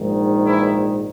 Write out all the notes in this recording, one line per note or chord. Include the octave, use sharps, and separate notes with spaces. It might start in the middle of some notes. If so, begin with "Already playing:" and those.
Already playing: A#1 G#2 D#3
E3 E4